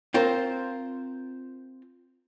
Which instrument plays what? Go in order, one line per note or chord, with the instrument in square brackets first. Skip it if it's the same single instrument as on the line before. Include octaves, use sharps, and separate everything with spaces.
[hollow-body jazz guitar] C4 F4 A#4 C5